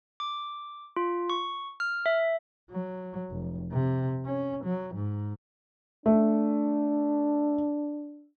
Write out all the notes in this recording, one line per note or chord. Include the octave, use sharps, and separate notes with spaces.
D6
F4
C#6
F6
E5
F#3
F1
C3
C#4
F#3
G#2
A3 D4